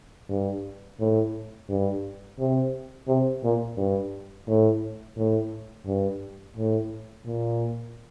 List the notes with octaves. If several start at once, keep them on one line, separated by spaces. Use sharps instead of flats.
G2
A2
G2
C3
C3
A#2
G2
A2
A2
G2
A2
A#2